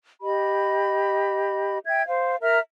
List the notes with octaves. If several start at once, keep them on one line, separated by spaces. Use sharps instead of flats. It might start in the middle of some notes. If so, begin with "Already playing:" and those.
G4 D#5 B5
E5 G5 G#6
C5 F5
A#4 E5 A#5 F6